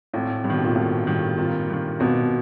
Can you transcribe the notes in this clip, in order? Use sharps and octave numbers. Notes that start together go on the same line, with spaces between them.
G#1 A2
G2
B2 D#3
A#2
G#1 A2
G2 D#3
G#1 A#2
G2 D#3
G#1 B2